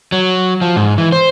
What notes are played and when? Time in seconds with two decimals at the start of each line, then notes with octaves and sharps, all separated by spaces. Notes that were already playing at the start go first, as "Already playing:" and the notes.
0.12 F#3
0.61 F3
0.76 G#2
0.98 E3
1.12 C5